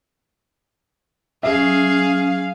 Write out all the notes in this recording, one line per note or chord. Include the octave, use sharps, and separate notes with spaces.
F#3 C#4 G#4 E5 F5